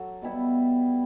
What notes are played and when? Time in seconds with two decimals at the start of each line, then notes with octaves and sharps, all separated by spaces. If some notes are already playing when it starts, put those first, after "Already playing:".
Already playing: F#3 F#4 A4
0.22 B2 G3 B3 E4